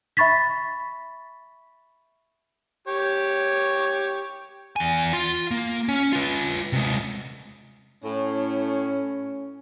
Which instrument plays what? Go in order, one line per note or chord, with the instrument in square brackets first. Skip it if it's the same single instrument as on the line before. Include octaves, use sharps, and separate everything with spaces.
[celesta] E5 B5 C#6 A6 B6
[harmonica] G4 C#5
[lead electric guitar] E2 G#5
F4 C6
A#3
C#4
F4 B4
C3 G#3
[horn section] A2 [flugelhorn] C#4